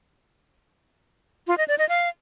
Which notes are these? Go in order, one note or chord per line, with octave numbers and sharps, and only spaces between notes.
F4
D#5
D5
D#5
F5